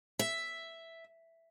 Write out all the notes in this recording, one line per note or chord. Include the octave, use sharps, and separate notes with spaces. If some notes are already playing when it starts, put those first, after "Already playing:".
E5